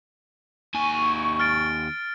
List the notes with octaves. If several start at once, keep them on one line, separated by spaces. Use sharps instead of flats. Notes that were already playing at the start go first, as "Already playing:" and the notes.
D#2 G#5 C#6
F6 A6 D7